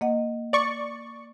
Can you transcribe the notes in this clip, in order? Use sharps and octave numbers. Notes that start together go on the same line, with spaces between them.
A#3 D#5 F#5
D5 C#6